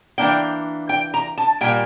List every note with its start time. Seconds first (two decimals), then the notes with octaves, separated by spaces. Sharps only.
0.18 E3 A#3 D4 G5
0.89 G5
1.14 A#5
1.38 A5
1.61 A#2 G3 A#3 G5